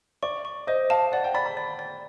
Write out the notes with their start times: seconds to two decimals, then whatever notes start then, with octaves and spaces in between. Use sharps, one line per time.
0.23 D5 C#6
0.45 C#6
0.67 C5 D#5
0.90 F5 A5
1.12 D5 F#5
1.24 G5
1.35 D5 B5
1.46 B5
1.57 D5
1.79 D5